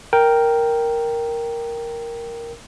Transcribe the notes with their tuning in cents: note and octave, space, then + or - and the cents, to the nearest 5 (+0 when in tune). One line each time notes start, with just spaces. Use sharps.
A#4 +0 G5 +0